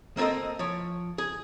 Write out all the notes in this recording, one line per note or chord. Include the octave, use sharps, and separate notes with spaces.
A#3 C4 A4 A#4 D#5
F3 C#5
G#4